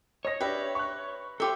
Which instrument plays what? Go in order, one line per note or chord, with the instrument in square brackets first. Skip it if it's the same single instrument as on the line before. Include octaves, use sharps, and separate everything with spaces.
[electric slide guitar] C#5 [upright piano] D#5 A#6
[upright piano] D4 G4 [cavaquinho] B4 E5
[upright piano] C#6 F#6
[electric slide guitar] F4 A4 [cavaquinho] G4 E5